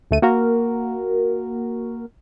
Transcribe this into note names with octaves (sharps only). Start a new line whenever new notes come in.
D2 A3 D#7
A#3 F#4 A#4